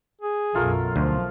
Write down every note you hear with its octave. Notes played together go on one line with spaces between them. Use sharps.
G#4
B1 F#2 A3 F4 A#4
D2 F3